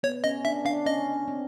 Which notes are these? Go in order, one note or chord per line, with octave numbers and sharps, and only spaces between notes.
B3 C#5
C#4 D#5
D4 E5
D4 F5
C#4 D#5
C4